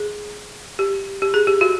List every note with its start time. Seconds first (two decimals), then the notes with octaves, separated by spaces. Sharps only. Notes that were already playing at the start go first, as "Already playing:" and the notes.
Already playing: G#4
0.79 G4
1.22 G4
1.34 G#4
1.47 G4
1.61 F#4